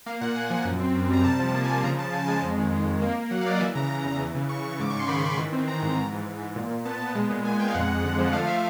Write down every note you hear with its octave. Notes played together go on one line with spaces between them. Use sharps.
A#3 F5
A#2 F#5
A#2 G#5
F3
F#2
C4
F#2
G3 A#5
C3 A5
F3
A#3
G#5
F3 A5
C#3 A#5
C#3 A5
C#3 G#5
A5
G#3 G#5
F2
D#3
F2
F2
A#3
A#3
F#3 F#5
F5
A#3 D5 D#5
E3 E5
C#3 A#5
E3
E2
E3
C#3
C#3 C#6
C#3
G#2 D6
C#6
G#2
C6
D#3 B5
D#3
E3
C4
C4 A#5
G#2
G#2
E3
G#2
G#2
A#2
A#2
B3 A5
B3
G#3
A#2
A#2 G#5
G#3 G5
F5
F2 F#5
F2
D3
F3
A3 F5
A3 E5